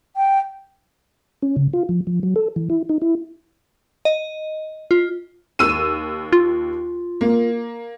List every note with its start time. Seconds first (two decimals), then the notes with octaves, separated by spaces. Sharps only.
0.17 G5
1.42 C#4
1.56 C#3
1.73 F4
1.89 F3
2.07 F3
2.23 F#3
2.36 A4
2.56 E3
2.70 E4
2.89 D#4
3.02 E4
4.05 D#5
4.91 F4
5.59 D#2 E6 D#7
6.33 F4
7.21 A#3